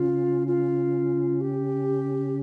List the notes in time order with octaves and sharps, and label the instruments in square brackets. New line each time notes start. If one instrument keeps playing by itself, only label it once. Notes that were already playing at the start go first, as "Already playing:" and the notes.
Already playing: [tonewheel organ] C#3 C#4 [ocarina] F4
[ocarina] F4
G4